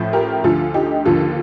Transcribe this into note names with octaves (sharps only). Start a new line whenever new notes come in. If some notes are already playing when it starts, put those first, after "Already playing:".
Already playing: A1 A2 F3
G4 A#4
D2 D3 F3 F4 A4
D#4 G4
D#2 D3 F3 F4 A4